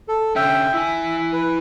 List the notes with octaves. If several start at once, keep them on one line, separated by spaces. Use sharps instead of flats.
A4
D3 C#4 E5 G5
E4 E5 G#5
B4